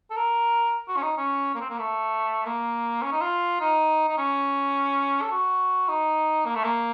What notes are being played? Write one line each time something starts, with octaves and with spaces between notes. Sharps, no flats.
A4
A#4
F#4
C#4
D#4
C#4
A#3
C4
A#3
A3
A#3
C#4
D#4
F4
D#4
D#4
C#4
A4
F#4
D#4
A#3
A3
A#3